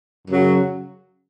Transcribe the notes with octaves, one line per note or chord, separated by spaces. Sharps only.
F#2 C#3 F#3